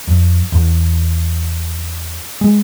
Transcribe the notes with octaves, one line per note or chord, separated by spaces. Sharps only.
F2
E2
G#3